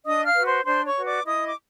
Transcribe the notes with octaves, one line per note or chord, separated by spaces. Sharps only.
D4 D#5 D#6
F5 F6
F#4 B4
C5 C6
D4 C5 C6
C#5 C#6
F#4 B4
D5 D6
E4 D#5 D#6
D6